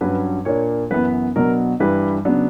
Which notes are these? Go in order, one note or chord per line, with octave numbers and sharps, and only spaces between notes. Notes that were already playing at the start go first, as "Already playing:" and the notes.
G2 F#3 C#4 B4
A#2 A#3 D4 C#5
F#2 E3 B3 B4
B2 F#3 B3 D4 A#4
G2 E3 G3 B4
C#3 F#3 B3 D4